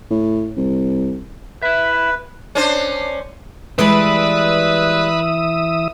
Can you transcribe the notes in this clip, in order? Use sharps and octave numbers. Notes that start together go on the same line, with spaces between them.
A2
C2
E4 B4 E5
C#4 D4 C5
E3 G3 G#3 B4 D5 E5 B5 D#6